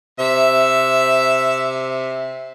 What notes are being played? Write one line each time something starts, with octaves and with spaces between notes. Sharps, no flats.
C3 E5